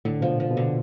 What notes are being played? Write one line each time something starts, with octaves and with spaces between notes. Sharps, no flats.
A2 D3
B2 F3
A#2
F3
B2
D3